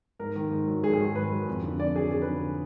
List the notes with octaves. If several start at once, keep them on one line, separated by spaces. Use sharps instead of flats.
G#2 A#4
D#3
G#2
F#3
G#2 G#4
G#4
D#3
G#2 B4
F#3
F2
D3
F2 D5
F#3 G#4
F2 G#4
B4
D3